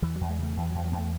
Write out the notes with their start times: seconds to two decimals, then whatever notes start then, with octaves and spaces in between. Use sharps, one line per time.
0.02 E2 E3
0.16 F#3
0.21 E2
0.29 G#3
0.39 C#3 A3
0.56 E2 E3
0.70 E2 F#3
0.84 F#3
0.92 E2 B3
0.98 A3